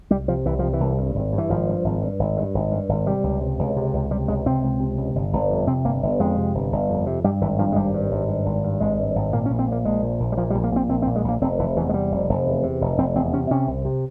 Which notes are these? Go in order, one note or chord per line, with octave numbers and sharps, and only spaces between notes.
C2 G3
C3 F3
C2 E3
C3 F3
E3
C2
G2
G#1
G2
E3
G#1 F3
G2
G#1
G2
G#1
G2
G#1
G2
G#1
C3 G3
C#2
C3
C#2
C3
C#2
C3 G3
C#2 G#3
C3 C4
C#2
C3
C#2
G1
G1
F2
C3 C4
G1 A#3
G1
F2 G#3
C3
G1
G1
F2
C3
G2 G3
G#1 E3
G2 F3
G#3
G#1 G3
G2
G#1
G2
G#1
G2
G#1 G#3
G2
G#1
A#2 A#3
C#4
A#1
C4
A#2 A#3
A#1 G#3
A#2
A#1
G3
A#2 F3
G3
A#1
A#3
A#2 C4
A#1 C4
C4
A#2
G#3
A#1 A#3
F1 C4
F1 E3
E2 E3
G#3
C3 G3
F1
F1
E2
C3
F1
F1 C4
E2 C4
C3 C#4
C3 C#4
C2
C3